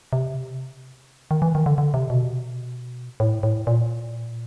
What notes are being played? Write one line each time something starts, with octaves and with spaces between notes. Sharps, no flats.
C3
D#3
E3
D#3
D3
D3
C3
B2
A2
A2
A#2